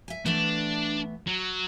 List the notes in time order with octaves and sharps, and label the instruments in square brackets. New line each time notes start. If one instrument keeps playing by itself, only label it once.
[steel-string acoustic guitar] E5 G#5
[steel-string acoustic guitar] E3 A3 B3 [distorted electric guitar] D4
[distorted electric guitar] F#3